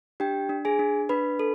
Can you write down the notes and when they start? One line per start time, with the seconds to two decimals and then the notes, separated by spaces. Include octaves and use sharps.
0.20 D4 G4 G5
0.49 D4
0.65 G#4 G#5
0.79 D4
1.09 D4 B4 B5
1.39 A4